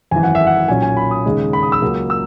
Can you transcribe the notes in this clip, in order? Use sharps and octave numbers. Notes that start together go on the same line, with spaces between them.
G#1 F#2 E3 G#5
F#5
E5
F#5
B1 A#2 F#3 C#4 G#5
G#5
B5
D#6
D#2 C#3 G#3 D#4
B5
D#6
E6
C#2 C#3 F#3 A#3
E6